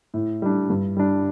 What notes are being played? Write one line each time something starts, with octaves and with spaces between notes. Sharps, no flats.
A2
G3 D4
G2
G3 D4